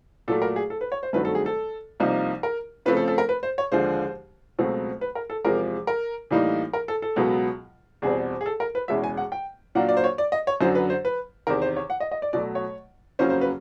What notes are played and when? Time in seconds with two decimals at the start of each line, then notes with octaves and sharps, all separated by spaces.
0.28 A#2 F#3 A3 A4
0.42 A#4
0.56 G#4
0.70 A4
0.81 B4
0.92 C#5
1.03 C5
1.13 G2 D#3 F#3 A3 C4 B4
1.25 A4
1.35 G#4
1.46 A4
2.00 C2 C3 F3 A#3 D#4
2.43 A#4
2.86 C#3 F3 A3 C4 B4
2.97 A4
3.08 A4
3.18 A#4
3.29 B4
3.43 C5
3.58 C#5
3.72 D#2 D3 F3 G#3 C5
4.59 C#2 B2 F#3 A3 C4
5.01 B4
5.15 A#4
5.30 A4
5.44 E2 C3 F3 G#3 A#4
5.87 A#4
6.31 A2 E3 G3 A#3 D#4
6.73 A#4
6.88 A4
7.02 A4
7.16 C#2 B2 F#3 B3
8.02 E2 B2 G3 C4 G#4
8.41 G#4
8.46 A4
8.60 A#4
8.75 B4
8.88 E2 B2 G#3 C#4 E4 E5
9.04 G#5
9.17 F#5
9.32 G5
9.75 A#2 F#3 A#3 D4 F#5
9.89 D5
9.97 C5
10.04 C#5
10.18 D5
10.32 D#5
10.47 C#5
10.61 F#2 D3 F#3 C5
10.75 B4
10.90 C5
11.05 B4
11.47 E2 C3 D#3 A#4
11.62 C5
11.76 C#5
11.90 F#5
12.00 D#5
12.12 D#5
12.22 D5
12.33 B2 F#3 A3 D5
12.55 C#5
13.19 F2 C#3 F#3 A#3 C#4 C5
13.30 C5
13.41 B4